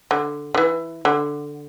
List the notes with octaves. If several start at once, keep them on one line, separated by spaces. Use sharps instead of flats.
D3
D3
E3
D3